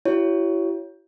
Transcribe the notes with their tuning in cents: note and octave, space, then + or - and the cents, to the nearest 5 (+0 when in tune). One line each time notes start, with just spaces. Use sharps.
E4 +30 G4 -40 C#5 +10